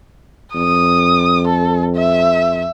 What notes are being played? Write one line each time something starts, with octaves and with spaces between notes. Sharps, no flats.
F2 D#6
A4
E5